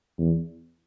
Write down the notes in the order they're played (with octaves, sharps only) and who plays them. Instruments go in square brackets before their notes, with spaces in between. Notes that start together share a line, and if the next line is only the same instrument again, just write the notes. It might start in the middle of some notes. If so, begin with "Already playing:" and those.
[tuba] E2